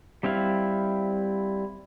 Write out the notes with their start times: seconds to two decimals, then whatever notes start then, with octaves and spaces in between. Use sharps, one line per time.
0.23 G3 C4 E4 F5